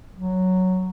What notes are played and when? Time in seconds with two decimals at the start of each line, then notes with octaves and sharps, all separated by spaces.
0.16 F#3